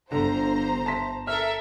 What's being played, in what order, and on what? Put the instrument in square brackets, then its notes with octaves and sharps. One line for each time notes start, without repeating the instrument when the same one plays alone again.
[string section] G1 C5 A#5 [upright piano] D3
[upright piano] A5 C6 B6
[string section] A4 A#4 E5 [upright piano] F6